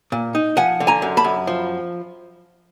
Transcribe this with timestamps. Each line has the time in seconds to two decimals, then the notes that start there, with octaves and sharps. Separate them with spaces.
0.12 A#2
0.35 D#4
0.57 F3 F#5 G#5
0.80 D3
0.87 G#5 A#5
1.02 F#2
1.17 A5 B5
1.24 F#2
1.47 F3